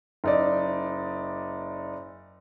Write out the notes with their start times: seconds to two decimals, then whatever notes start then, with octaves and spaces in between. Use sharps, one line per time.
0.24 F#1 D#4 D5